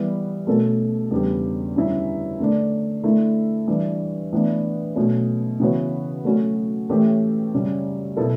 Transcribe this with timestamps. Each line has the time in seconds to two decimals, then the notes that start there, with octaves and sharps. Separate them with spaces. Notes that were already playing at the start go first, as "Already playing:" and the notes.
Already playing: E3 G3 B3
0.47 B2 A3 C#4 F#4 A4
1.11 E2 C#3 G3 D4 G4
1.76 F#2 D3 G3 C#4 E4
2.40 D3 A3 D4
3.03 D3 A3 E4
3.67 E3 G3 D4
4.32 A2 E3 B3 D4
4.96 B2 F#3 A3 C#4
5.60 C#3 E3 B3 F#4 C#5
6.25 F#3 A3 C#4 F#4
6.89 A2 E3 A3 C#4 G4
7.54 F#2 C#3 G3 C#4
8.17 B2 F#3 B3 E4 A4